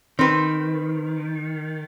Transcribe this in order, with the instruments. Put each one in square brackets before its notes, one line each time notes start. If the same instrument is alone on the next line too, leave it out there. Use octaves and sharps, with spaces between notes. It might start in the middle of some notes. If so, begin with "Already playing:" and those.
[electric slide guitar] D#3 [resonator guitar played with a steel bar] C4 B4